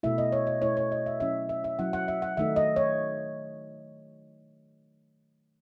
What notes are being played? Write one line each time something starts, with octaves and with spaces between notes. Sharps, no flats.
B2 A3 E4 E5
D#5
C#5
D#5
B2 A3 E4 C#5
C#5
D#5
E5
F#3 C#4 E4 E5
E5
E5
F#3 C#4 E4 F#5
F#5
E5
F#5
D#3 A3 D#4 E5
D#5
C#5